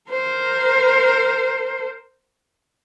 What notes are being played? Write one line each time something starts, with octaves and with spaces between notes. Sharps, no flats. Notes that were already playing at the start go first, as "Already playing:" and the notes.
A#4 C5